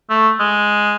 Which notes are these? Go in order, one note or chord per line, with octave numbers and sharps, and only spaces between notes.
A3
G#3